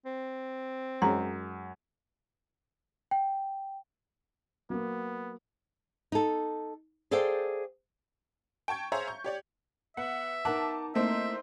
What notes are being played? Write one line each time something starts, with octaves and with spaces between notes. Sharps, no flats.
C4
F#2 G#3 C#4 A#5
G5
F#3 A#3 B3
D#4 A4
G#4 A4 C5 D5 F5 G5
G5 A5 C#6 G#6
G#4 C5 C#5 E5 F5 A#5
C#6 G6
G4 C#5 D5
B3 E5 F#5
D#4 A#4 F#5 A5 D6
A3 A#3 C4 D#4 E4 C5 E5